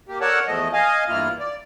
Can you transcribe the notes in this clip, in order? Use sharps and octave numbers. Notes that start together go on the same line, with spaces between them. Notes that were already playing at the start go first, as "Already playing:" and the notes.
A#3 G4
A4 A#4 C#5 D5 F#5 A5
E2 F3 A3 D#5
D#5 F5 G#5
E2 G2 A#3 E4 F4 F6
D5